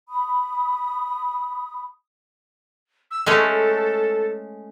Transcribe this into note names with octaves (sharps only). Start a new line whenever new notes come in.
B5 D#6
E6
G#3 A3 C#4 A4